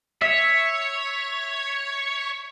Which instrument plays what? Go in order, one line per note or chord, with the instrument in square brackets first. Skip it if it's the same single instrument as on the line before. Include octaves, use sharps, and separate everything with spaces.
[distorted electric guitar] C#5 [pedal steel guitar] E5